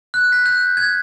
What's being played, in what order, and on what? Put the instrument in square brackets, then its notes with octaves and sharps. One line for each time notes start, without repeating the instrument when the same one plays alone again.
[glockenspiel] F#6
B6
G6
G#6